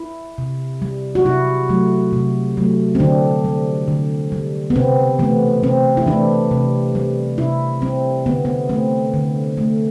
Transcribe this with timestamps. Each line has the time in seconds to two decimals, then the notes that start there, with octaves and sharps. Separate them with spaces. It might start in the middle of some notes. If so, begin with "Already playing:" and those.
Already playing: E4
0.38 C3
0.82 G3
1.15 F#4
1.25 C3 E4
1.69 F#3 A3
2.13 C3
2.57 F#3 A3
2.95 C4
3.00 D3 D4
3.44 G3
3.88 D3
4.32 G3
4.70 B3
4.76 C3 C4
5.19 E3 A3 B3
5.63 C3 C4
5.97 E4
6.06 E3 A3 D4
6.51 C3
6.95 G3
7.38 C3 E4
7.82 G3 C4
8.26 D3 B3
8.45 B3
8.69 A3 C4
9.14 D3
9.58 A3